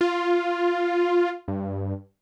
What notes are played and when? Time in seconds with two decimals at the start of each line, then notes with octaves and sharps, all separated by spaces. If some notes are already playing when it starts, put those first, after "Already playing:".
0.01 F4
1.48 G2